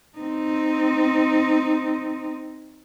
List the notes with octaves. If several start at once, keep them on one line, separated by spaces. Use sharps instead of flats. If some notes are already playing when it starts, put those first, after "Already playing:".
C4 D#4